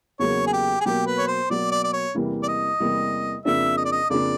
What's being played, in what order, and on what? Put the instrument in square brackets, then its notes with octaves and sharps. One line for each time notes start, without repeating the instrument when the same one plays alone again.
[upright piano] E2 C#3 F#3 A#3 [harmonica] C#5
[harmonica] G#4
G4
G#4
[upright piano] B2 F#3 A#3 [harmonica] G4
[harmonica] B4
C#5
C5
[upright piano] B2 F#3 A#3 [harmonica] D5
[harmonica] D5
D5
C#5
[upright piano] E2 C3 E3 G3 A#3
[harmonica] D5
D#5
[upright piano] E2 C3 E3 G3 A#3
[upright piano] F2 C#3 F3 A#3 D4 [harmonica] E5
[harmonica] D#5
D5
D#5
[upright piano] F2 C#3 F3 A#3 D4 [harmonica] D5